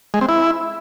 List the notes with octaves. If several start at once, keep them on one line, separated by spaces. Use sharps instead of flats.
G#3
C4
E4